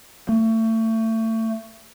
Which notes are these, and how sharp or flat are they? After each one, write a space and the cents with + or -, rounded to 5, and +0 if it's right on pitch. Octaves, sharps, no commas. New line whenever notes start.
A3 +30